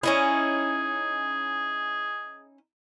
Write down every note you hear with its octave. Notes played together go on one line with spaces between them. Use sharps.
C#4 D#4 E4 G#4